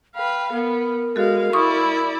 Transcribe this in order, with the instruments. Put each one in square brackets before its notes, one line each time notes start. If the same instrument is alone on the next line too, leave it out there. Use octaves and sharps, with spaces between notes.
[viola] B4 F5 [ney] G5
[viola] B3 [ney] A#4
[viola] G#3 F5 [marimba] F#4 A4
[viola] E4 D5 [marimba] C6 C#6 D#6